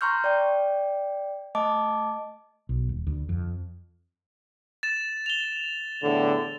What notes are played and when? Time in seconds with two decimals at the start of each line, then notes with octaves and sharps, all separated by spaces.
0.01 A#5 C6 C#6 F6 G6
0.24 D5 G5
1.55 A3 D#5 A5 D6
2.69 B1
2.89 D#1
3.07 D2
3.29 F2
4.83 A6 E7
5.26 F7 G7
6.03 E2 A2 D3